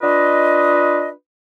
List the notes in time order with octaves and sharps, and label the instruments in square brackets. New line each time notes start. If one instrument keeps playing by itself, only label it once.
[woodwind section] D4 F4 B4 D#5